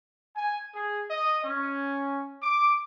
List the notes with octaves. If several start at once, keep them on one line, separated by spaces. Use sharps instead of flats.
G#5
G#4
D#5
C#4
D6